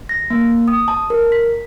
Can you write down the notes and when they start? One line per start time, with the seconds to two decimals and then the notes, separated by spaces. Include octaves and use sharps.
0.09 A#6
0.30 A#3
0.68 D#6
0.88 A5
1.10 A#4
1.32 B6